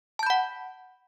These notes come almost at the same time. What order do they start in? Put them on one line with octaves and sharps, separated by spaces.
A5 G6 B5 F#5